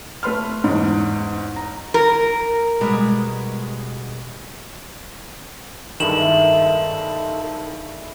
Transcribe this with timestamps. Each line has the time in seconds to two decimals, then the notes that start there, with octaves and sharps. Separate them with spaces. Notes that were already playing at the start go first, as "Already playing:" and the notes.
0.23 A3 B4 C6 F6
0.64 E2 G#2
1.56 A#5
1.94 A#4
2.81 B2 G3 G#3
6.00 G2 D#3 G3 G#3 E4 A4 E7 F#7